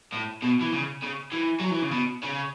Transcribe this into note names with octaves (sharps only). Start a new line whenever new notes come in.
A2
B2
E3
C#3
C#3
E3
F#3
E3
C#3
B2
C#3